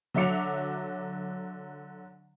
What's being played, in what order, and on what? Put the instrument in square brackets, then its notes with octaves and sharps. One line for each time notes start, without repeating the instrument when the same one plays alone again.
[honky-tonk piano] D3 F#3 E5 D6 C#7 F7